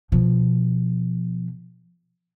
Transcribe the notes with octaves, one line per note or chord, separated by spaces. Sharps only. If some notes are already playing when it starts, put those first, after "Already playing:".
B2 F3